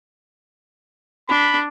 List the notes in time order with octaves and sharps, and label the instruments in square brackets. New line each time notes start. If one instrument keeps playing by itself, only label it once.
[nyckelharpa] D4 [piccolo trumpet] B5